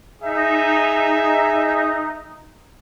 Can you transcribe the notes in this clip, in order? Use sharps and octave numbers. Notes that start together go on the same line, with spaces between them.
D#4 G#4 E5